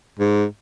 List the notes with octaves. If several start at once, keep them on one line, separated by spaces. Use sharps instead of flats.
G#2